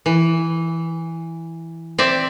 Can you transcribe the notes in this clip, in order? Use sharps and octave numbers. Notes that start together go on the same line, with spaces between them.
E3
C4 D5 E5